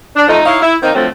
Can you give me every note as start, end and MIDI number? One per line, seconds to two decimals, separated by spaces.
0.16 0.27 62
0.28 0.40 41
0.28 0.40 53
0.28 0.40 57
0.28 0.40 63
0.46 0.61 63
0.46 0.61 64
0.46 0.61 73
0.46 0.61 77
0.62 0.75 64
0.83 0.93 51
0.83 0.93 58
0.83 0.93 60
0.83 0.93 63
0.94 1.06 50
0.94 1.06 53
0.94 1.06 54
0.94 1.06 57
0.94 1.06 60